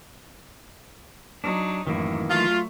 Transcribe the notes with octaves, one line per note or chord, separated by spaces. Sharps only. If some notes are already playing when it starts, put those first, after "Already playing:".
F#3 D4 D#4
F#2 A2 D#3 E3 A#3
F#3 A3 F4